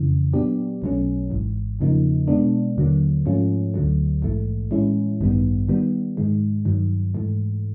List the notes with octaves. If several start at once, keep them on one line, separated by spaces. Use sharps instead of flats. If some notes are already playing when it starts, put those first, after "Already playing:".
Already playing: F2 C#3 E3
A#2 F#3 B3 D4 G4
B1 B2 F#3 A3 C#4
G#1 G#2 E3
E2 C#3 F3 A#3 D#4
B2 G#3 B3 D4
D#2 D3 F#3 A#3
G#2 F3 A3 C#4 F4
D2 D3 F#3 A3
A#1 G#2 E3 A3
A2 E3 G#3 C#4 E4
A1 G2 D#3 G3 B3
D#3 G3 B3
G#2 D#3 G#3
G2 D#3 F#3
G#2 E3 A3